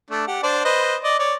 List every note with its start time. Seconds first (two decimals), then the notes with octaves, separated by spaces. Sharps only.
0.10 A3 D4
0.27 G4 F#5
0.43 D4 C5 D5
0.65 B4 C5 D#5
1.04 D5 D#5
1.19 C#5 D5